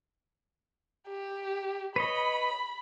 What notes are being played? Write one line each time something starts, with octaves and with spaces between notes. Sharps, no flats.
G4
B4 C#5 D#5 B5